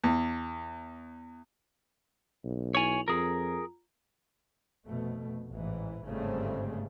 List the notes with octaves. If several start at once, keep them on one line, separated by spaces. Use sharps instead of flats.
E2
B1
E4 C#5 G#5 F7 F#7
F2 F4 G#4 A#4 A#5
F1 B2 A3
A1 G#2 E3
G1 G#2 C#3 G3 A3 C4